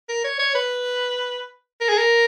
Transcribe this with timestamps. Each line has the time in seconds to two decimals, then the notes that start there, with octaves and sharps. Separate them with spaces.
0.09 A#4
0.25 C#5
0.39 C#5
0.55 B4
1.81 A#4
1.89 G#4
1.98 A#4